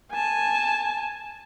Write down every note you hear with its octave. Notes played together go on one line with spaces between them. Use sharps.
G#5 A5